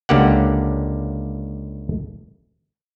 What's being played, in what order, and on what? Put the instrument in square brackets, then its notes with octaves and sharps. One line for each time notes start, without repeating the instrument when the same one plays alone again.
[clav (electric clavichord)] C#2 D3 A#3 G4 F#5